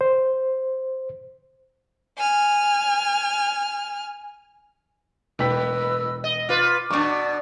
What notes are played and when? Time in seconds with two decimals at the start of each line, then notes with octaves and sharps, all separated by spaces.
0.01 C5
2.18 G#5 F6
5.39 E1 A2 B4 D#5 G5 E6 B6
6.24 D#5
6.49 F4 B4 D6
6.91 F#2 B2 D4 C#6 A6